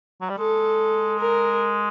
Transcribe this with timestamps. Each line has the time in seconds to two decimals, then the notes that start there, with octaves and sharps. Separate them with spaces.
0.21 F#3
0.29 G3
0.38 G#3 A4
1.19 A#4